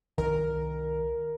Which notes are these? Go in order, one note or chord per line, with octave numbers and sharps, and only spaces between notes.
C2 D#3 A#4